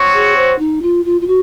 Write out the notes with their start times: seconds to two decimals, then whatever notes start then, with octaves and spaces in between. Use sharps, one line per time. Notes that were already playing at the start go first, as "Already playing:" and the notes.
Already playing: C4 F#4 C#5
0.13 G#4
0.37 C5
0.59 D#4
0.82 F4
1.05 F4
1.21 F4
1.27 F#4